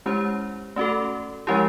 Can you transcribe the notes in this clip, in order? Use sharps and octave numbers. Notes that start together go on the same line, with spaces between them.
G#3 C#4 E4 G4 C5
A3 C#4 F#4 A4
F3 G#3 C#4 E4 G4